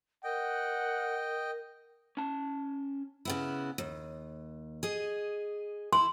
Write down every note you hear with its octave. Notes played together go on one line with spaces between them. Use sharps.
A#4 D#5 F#5 G5
C#4 A5
C#3 B3 E4
D#2
G#4 D#5
E4 C6